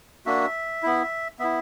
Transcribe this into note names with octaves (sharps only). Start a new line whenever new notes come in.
A#3 D4 F#4 E5
B3 E4
B3 E4 E5